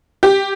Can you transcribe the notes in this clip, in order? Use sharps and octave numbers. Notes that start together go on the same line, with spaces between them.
G4